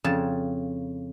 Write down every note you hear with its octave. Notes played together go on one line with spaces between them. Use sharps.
F2 C#3 A5